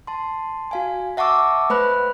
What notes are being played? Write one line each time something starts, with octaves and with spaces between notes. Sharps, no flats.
A5 C6
F#4 F5 G#5
E5 F#5 A5 C#6 D6 E6
A3 B4 C5 B5 F#6